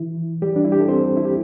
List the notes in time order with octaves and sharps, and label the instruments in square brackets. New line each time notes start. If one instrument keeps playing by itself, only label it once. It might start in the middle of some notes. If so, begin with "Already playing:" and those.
Already playing: [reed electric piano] E3 E4
G3 G4
D4
E4
G4
A4
C4 C5
E4
G4